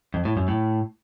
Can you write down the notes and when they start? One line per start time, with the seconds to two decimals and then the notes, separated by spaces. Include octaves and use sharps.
0.14 F2
0.25 A2
0.37 F#2
0.48 A2